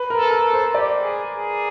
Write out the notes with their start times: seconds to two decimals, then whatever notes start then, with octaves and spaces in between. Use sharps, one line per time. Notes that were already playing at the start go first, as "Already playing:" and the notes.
Already playing: B4
0.10 A#4
0.17 A4
0.31 A#4
0.45 A4
0.53 C5
0.74 G4 D5
1.02 G#4
1.31 G#4